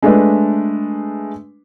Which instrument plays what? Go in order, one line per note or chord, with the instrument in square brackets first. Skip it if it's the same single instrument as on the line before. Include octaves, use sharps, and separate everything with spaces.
[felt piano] G#3 A3 D4 B4